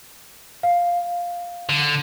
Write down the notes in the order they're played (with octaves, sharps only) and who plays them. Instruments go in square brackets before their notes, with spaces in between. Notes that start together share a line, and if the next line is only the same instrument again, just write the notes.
[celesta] F5
[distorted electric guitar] D3